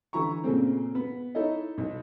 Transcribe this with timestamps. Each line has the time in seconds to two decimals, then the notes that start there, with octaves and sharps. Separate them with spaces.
0.13 D3 E3 E4 A#5 C#6
0.44 A#2 C#3 A3 C4
0.95 B3
1.35 D#4 E4 A4 C#5 D#5
1.78 B1